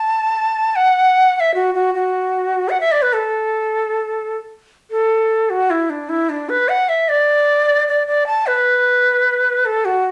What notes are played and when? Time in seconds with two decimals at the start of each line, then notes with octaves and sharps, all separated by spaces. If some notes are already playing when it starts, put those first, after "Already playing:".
Already playing: A5
0.76 F#5
1.35 F#5
1.40 E5
1.55 F#4
1.75 F#4
1.95 F#4
2.70 F#5
2.80 E5
2.92 D5
3.02 B4
3.13 A4
4.91 A4
5.50 F#4
5.70 E4
5.90 D4
6.09 E4
6.29 D4
6.49 B4
6.69 F#5
6.89 E5
7.09 D5
7.88 D5
8.07 D5
8.27 A5
8.47 B4
9.65 A4
9.85 F#4